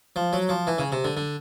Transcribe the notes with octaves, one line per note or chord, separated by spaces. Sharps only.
F3
F#3
F3
E3
C#3
C3
D3
D3